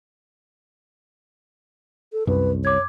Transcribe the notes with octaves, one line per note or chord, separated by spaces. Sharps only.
A4
C2 F#2 B4
C#5 D6 G#6